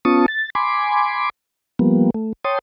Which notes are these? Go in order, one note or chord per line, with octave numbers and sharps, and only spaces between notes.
B3 C#4 F4 A5 C#6 D#6
A6
G#5 B5 C6 D6
F3 G3 A#3 B3
A3
C#5 G5 A5 C6 D#6